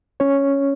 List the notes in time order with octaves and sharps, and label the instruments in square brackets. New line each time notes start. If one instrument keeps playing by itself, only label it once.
[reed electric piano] C#4 C#5